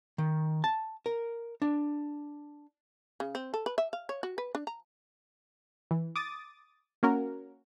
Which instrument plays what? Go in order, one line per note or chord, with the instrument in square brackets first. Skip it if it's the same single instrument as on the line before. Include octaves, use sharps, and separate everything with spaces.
[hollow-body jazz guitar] D#3
A5
A#4
D4
[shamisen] C#3
C4
A4
B4
E5
F5
C#5
F#4
B4
D4
A#5
[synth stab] E3
D6 D#6 A6
A#3 C#4 F#4 A#4